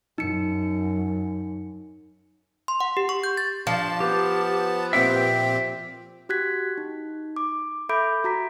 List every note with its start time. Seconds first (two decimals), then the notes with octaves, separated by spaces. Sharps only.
0.18 F#2 D#4 C#7
2.68 C6
2.80 F#5
2.97 G4
3.09 C#6
3.23 G6
3.37 A6
3.67 F3 D4 A5
4.00 B3 G4
4.93 A#2 C4 G4 E5 G5
6.29 F#4 G4 F#6 G#6 B6
6.78 D#4
7.36 D6
7.89 A4 E5 B5 D6 G6 D7
8.24 F#4 A#5 B6